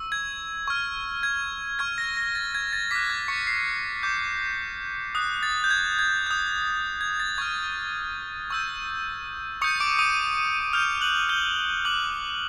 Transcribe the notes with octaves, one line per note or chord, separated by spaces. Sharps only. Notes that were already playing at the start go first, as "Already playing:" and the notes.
Already playing: C#6 E6
G#6
C#6 F6
G#6
C#6 F6 G#6
A#6
A#6
A6
G#6
A6
D6 F#6 B6
G#6
C#6 C#7
C7
D6 G6
D#6 F#6
A6
G6
G#6
G#6
D#6 G6
G#6
A6
C#6 F6 G#6
C#6 E6 G6
C#6 D#6 G6 C#7
D6 D7
D#6 D#7
D#6 F6 G6 F7
F#6 F#7
G6 G7
D6 F#6 G6 F#7